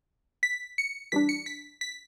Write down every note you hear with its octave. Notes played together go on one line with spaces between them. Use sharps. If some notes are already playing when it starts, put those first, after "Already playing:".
B6
C#7
E3 G3 D4 B6
C#7
B6
B6